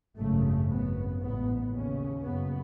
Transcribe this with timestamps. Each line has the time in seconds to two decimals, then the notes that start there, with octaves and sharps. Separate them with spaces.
0.17 G#1 F#2 C#3 A3
0.69 G#1 F#2 C#3 B3
1.20 A1 G#2 B3
1.73 D#2 C#3 C#4
2.24 F#1 F#2 C#3 B3